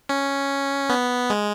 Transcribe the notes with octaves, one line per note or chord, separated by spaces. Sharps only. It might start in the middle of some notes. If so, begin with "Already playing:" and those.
C#4
B3
G#3